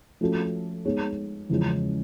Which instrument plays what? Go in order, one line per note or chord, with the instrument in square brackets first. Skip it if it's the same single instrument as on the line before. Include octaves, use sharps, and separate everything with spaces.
[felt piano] F3 A3 C#4 F#4 A4
G#3 B3 D#4 G#4 C#5
E2 C#3 F3 G#3 C#4